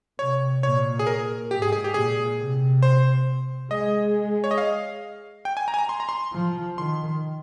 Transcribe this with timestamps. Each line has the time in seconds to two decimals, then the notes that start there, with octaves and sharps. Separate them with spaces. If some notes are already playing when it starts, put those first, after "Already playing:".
0.19 C3 C#5
0.63 A#2 C#5
0.99 G#4
1.07 A#4
1.51 G#2 G4
1.62 G#4
1.72 G#4
1.84 G4
1.94 A#2 G#4
2.39 C3
2.83 C5
3.70 G#3 D#5
4.44 C#5
4.51 D#5
4.58 F5
5.45 G5
5.57 G#5
5.68 A#5
5.74 G#5
5.79 A#5
5.89 C6
6.00 A#5
6.09 C6
6.33 F3
6.77 D#3 C6